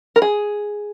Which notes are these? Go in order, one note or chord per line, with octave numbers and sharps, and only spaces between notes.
A#4
G#4